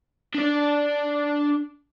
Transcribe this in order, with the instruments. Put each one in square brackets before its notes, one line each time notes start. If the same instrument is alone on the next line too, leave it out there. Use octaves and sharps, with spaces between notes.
[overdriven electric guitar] D4 D5